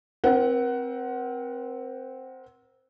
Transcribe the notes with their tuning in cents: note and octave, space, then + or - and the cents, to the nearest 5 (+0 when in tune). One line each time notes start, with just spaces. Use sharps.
C4 +0 A#4 +40 F#5 +15